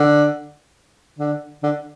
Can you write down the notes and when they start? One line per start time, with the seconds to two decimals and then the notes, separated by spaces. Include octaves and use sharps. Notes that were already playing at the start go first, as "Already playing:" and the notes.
Already playing: D3
1.19 D3
1.63 D3